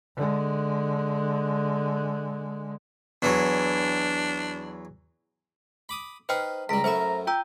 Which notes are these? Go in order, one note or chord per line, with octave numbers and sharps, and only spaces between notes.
D3 G#3
E2 E3 F#3 D4
B5 D6 D#6
D#4 B4 C5 G5 F6
C#2 G3 A#5 B6 D7
F#2 A3 C5 B5 C#6
F4 G5 A#5 E6